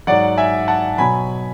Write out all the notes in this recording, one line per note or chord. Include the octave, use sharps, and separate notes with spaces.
G#2 F#3 D5 F#5
E5 G#5
F#5 A5
B2 F#3 G#5 B5